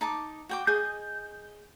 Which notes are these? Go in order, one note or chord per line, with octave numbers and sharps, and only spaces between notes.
D#4 A5 D6
F#4 G5 D6
G#4 D#5 G6